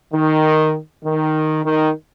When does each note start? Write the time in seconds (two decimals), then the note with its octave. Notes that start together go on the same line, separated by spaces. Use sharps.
0.13 D#3
1.04 D#3
1.64 D#3